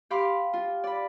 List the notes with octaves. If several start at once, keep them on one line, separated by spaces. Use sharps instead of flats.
G4 F5 B5 C6 D6
F4
D5 B5